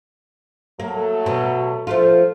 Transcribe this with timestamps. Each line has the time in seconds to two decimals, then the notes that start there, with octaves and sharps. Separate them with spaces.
0.80 F#3 A3 A#3 A4
1.26 B2
1.87 F3 A3 F4